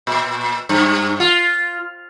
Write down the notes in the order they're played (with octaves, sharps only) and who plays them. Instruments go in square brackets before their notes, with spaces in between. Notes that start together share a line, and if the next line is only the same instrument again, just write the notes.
[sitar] A#2
G2
F4